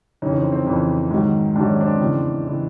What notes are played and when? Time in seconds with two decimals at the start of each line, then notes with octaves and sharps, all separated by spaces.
0.22 F2 C#3 E3 C#4 D#4
0.37 C4
0.52 C4
0.67 F2 C#3 E3
1.11 G#2 D#3 F#3
1.56 G#2 D#3 F#3 D4
1.69 C#4
1.81 C4 D4
2.00 E2 C#3 E3
2.46 C#3 E3